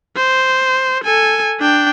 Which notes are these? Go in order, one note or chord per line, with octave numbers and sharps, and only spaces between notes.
C5
A4 G#5
D4 G5